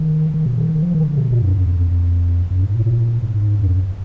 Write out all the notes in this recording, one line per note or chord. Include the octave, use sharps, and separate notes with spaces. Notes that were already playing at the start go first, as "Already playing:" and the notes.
Already playing: D#3
D#3
B2
D#3
D#3
F3
D#3
D3
B2
A#2
F#2
F2
F2
F#2
G#2
A#2
A#2
G#2
F2
F#2